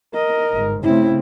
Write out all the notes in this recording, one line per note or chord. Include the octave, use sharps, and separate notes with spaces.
A#4 D#5
G1 G#2
C#3 A3 C4 E4